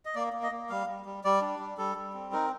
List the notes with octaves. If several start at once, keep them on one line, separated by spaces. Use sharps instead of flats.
D#5
A#3 D5
A#3
D#5
A#3
G3 F5
G3
G3
G3 D5
D4
G3
G3 A4
G3
C4
D#4 A#4